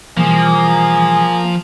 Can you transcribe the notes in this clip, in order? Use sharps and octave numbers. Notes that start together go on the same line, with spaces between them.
B2 E3 F3 G3 A#3 G#4